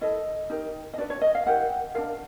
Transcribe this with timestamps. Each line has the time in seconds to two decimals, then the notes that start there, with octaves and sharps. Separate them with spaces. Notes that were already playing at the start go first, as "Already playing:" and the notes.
0.01 E4 A4 D#5
0.50 D#4 G4 A#4
0.93 D#5
0.98 D4 F#4 B4 D5
1.10 C#5
1.21 D#5
1.35 F5
1.46 E4 G4 A#4 F#5
1.95 F4 A#4 F5
1.98 D4